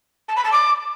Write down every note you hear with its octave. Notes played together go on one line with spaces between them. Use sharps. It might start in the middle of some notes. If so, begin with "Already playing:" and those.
A5
B5
A5
D6